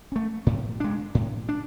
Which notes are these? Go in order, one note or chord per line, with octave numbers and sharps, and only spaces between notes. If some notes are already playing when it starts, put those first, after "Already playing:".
A3 C#4
A2
G#3 D4
A2
D4